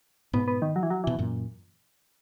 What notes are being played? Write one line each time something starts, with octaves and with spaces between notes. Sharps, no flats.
G#2 B2 B3
B3
D#3
F#3
E3
F#3
B2 E3
F#2 A#2